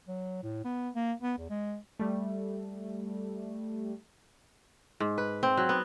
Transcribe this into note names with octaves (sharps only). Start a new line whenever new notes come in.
F#3
A2
B3
A#3
B3
E2
G#3
G3 A3
G#2
B4
C4
F#3
B3